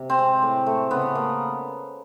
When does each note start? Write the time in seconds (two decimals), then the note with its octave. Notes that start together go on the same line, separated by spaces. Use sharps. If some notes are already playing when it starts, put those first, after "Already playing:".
Already playing: C3
0.10 C4
0.19 G#3
0.42 A2
0.66 A3
0.91 C#3 B3
1.15 A#3